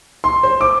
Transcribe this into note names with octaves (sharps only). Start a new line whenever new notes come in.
C6
C5
D6